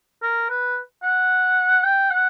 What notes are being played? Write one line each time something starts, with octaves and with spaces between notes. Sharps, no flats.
A#4
B4
F#5
G5
F#5